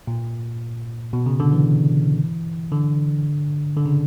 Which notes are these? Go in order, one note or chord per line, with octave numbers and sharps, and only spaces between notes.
A#2
B2
C#3
D3
E3
D3
D3
C#3